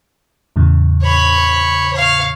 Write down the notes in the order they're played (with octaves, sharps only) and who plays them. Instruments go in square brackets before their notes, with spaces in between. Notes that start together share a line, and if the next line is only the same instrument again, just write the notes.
[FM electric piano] E2 A2 C#3
[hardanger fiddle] C#5 B5
C#5 F5